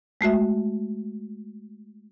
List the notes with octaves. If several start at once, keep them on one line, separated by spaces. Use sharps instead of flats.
G#3 A3 F#4 E5